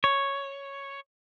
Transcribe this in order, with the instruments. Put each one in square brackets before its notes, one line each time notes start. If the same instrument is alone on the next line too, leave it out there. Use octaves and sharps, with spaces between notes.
[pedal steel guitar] C#5